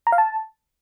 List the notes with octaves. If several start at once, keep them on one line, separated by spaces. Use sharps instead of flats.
A#5
F5
A5